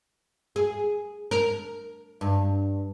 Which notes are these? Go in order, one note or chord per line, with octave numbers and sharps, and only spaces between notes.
G#4
A#4
G2